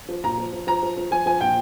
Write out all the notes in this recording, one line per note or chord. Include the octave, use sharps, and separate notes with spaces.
F3
A#2 A#5
F3
F3
F3 A#5
F3
F3
F3 G#5
F3 G#5
A#2 G5